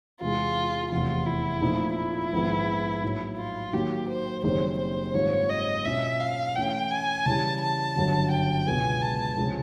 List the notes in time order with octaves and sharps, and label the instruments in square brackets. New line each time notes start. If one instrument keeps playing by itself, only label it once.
[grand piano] E2 C3 E3 G#3 [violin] F4
[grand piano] F1 E2 C3 [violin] F4
[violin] E4
[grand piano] A#2 F3 A3 C4 D#4
[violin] E4
[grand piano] A#1 G#2 D#3 G#3 B3
A2 F#3 A#3 D#4
[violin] F4
[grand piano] D#3 F#3 A#3 [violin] G4
[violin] C5
[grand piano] F#1 F#2 D#3 G3 C4 [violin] C5
[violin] C5
[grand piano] G#2 D#3 G3 C4 F4 [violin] C#5
[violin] D#5
[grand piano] B2 G#3 C#4 F4 [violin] E5
[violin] F5
[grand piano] E3 A3 C#4 E4 [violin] G5
[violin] G#5
[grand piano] C#3 E3 G3 [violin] A5
[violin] A5
[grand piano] G1 F#2 D3 F#3
[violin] G5
[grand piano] C#2 B2 G#3 B3 [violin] G#5
[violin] A5
[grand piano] C#2 C3 F3 G#3 C#4